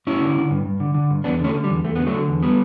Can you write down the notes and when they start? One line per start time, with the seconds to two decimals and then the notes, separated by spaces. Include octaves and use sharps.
0.07 G2 C#4 E4
0.21 D3
0.36 D3
0.51 G2
0.66 G2
0.80 D3
0.94 D3
1.10 G2
1.24 E2 B3 D4
1.40 D3 A3 C#4
1.54 D3
1.64 G3
1.69 E2
1.84 E2 A3
1.95 D3 B3
2.07 F#3 A3
2.14 D3
2.29 E2
2.43 G3 B3